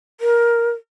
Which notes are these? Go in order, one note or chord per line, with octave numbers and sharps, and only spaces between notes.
A#4